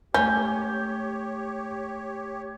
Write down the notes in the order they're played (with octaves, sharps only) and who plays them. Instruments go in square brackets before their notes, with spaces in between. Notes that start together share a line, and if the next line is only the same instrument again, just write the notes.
[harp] G#2 A3 [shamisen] C#4 [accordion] G4 C#5 [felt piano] G6